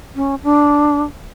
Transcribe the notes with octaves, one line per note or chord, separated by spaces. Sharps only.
C#4
D4